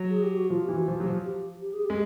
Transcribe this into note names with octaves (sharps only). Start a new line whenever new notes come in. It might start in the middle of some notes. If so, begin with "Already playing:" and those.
Already playing: F#3
G#4
G4
F#4
F3 F4
G4
E3
F#4
F3
F#3 G4
F3
G4
G4
G#4
G4
G#3